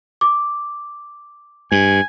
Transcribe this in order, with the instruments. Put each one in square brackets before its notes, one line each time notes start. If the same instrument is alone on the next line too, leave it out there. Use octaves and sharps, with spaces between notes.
[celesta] D6
[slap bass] G2 [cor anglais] G#5